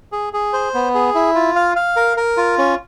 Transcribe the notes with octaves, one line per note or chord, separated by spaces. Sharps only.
G#4
G#4
C5
B3
G#4
E4
F4
F5
F5
A#4
A#4
F4
C#4